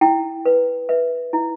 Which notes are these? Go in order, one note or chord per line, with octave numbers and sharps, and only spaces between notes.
E4 G5
B4
B4 E5
E4